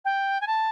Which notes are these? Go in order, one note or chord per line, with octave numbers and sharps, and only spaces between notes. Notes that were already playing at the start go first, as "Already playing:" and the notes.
G5
G#5
A5